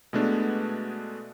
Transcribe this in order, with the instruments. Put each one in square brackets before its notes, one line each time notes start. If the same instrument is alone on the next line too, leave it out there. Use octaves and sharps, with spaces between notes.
[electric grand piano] B2 G#3 A3 B3 D4